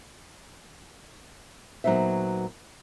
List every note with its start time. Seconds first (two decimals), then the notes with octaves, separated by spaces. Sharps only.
1.84 A#2 F#3 B3 D#4 C5 E5